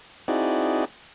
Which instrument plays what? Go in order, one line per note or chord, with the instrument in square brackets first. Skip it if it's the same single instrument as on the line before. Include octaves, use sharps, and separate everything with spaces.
[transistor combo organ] C4 D#4 E4 F#4 G#4 D5